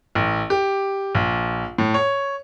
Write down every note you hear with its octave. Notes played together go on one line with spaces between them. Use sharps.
A1
G4
A#1
A2
C#5